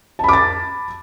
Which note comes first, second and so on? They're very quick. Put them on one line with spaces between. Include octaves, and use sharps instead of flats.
A5 B5 D6 A6